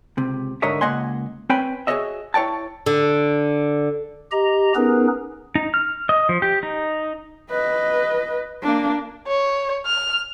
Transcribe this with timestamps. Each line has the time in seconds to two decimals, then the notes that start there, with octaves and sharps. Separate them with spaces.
0.17 C#2 C3
0.62 G#2 D3 A#4 C#5 D#5 E5
0.81 C#2 A#3 D#5 F#5 G#5 C6
1.50 C4 B4 C#5 G5 G#5 B5
1.87 F#4 G#4 A#4 C#5 D#5 E5
2.34 E4 C#5 D5 G5 A5
2.86 D3
4.32 G4 D#5 A#5
4.75 B3 C#4 D#4 G#4 A#4 B4
5.55 D#4
5.74 F6
6.09 D#5
6.29 F3
6.42 G4
6.63 D#4
7.51 B4 D#5
8.62 A#3 D4
9.27 C#5
9.86 F6